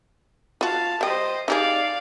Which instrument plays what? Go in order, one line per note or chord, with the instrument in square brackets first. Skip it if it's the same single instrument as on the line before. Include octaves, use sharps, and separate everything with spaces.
[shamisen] F4 F#4 [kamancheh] F5 A5
[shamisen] G3 G5 [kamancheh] C5 D#5
[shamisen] D#4 G4 G#4 [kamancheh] D5 F5